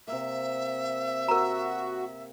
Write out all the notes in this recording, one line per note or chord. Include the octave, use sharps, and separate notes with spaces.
C3 A#3 E5
F#4 A#4 A#5